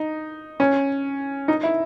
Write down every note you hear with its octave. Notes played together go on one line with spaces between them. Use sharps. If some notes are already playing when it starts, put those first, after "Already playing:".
Already playing: D#4
C#4
D#4
E4